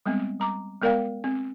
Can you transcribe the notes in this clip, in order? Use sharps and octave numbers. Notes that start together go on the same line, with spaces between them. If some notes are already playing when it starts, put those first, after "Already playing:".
G3 G#3 B3 C4
G3 A#5 D6
G#3 B3 A#4 D5 F5 G5
C4